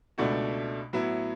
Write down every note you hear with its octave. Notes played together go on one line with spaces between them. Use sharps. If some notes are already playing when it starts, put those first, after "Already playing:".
C#2 B2 A3 D4 F#4
A2 F#3 B3 E4